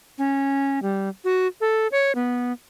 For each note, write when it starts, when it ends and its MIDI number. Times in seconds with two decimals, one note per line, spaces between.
0.18 0.79 61
0.82 1.09 55
1.24 1.47 66
1.61 1.87 69
1.92 2.12 73
2.15 2.52 59